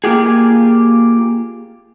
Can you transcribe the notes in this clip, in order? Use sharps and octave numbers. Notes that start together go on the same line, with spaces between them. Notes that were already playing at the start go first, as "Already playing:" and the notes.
A#3 F4 G4 G#4